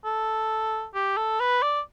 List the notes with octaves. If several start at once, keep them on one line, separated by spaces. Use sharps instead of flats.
A4
G4
A4
B4
D5